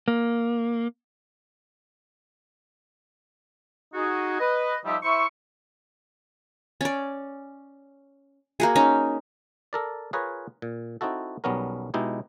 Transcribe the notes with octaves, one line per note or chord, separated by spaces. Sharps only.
A#3
D#4 F#4 G#4
B4 D#5
F3 G3 D#4 G4 E5
E4 C5 E5 C#6
C#4 D5
A#3 F#4 G#4
C#4 D#4
A4 A#4 D5
F4 G#4 A#4 B4 C#5
A#2
C4 D#4 E4 F#4 A4
B1 G3 B3 C#4 A#4
B2 G#3 D#4 E4 G4